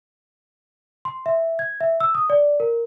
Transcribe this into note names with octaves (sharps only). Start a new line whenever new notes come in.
C6
E5
G#6
E5
E6
D#6
D5
A#4